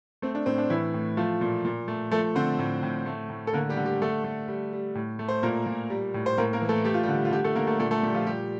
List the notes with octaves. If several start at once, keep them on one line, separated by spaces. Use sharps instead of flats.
A3 C4
D4
A2 C4
D4
A2 E3 E4
A2
F3 A3 F4
A#2
A#2
A3
F3 A3 A4
D3 C4 C5
A2
A2
A3
A2
A4
D3 A#3 A#4
G3 G4
D3
G3 G4
D3 A3 A4
A3
G3
G3
A2
A3
C5
A#2 A#3 A#4
A#2
G3
A2
C5
A2 A#3 A#4
A#3 A#4
E3
A3 A4
A3 G4
F4
G3 G4
D3
F4
D3 G3 G4
A3 A4
D3 A#3 A#4
A3 A4
A#2 A3 A4
A3 A4
A#2 G3 G4
F3 F4
G3 G4